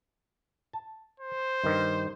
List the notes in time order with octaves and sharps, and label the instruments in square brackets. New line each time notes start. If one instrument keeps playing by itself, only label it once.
[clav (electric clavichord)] A5
[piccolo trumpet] C5
[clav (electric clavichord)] G2 D#3